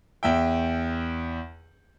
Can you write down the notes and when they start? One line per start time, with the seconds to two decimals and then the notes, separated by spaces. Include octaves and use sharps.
0.23 E2 E5 G5